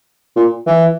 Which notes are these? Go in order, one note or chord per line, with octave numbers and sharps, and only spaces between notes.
A#2
E3